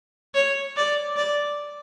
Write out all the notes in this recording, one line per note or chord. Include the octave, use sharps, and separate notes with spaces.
C#5
D5
D5